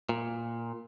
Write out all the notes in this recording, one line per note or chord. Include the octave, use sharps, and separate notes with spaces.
A#2